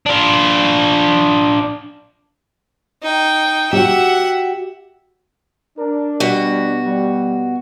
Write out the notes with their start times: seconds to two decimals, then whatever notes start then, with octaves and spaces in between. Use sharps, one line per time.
0.06 D4 F4
3.02 D#4 G5
3.73 F#4 G4 E5 F#5
5.78 D4 A#4
6.20 B2 G3 F#4
6.85 G3